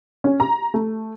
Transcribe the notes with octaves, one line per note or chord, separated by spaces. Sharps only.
C#4
A#5
A3